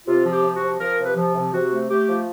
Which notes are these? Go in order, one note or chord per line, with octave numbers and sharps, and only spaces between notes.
C3 F4
F3
G4
C3
F#4
F3
F3 A#4
C3 B4
F3
C3
C3 F#4
A3
A3 G4
F3